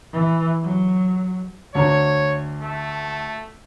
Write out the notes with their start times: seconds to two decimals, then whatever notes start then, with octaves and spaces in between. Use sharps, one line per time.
0.13 E3
0.63 F#3
1.75 D2 D4 C#5 A#5
2.61 A3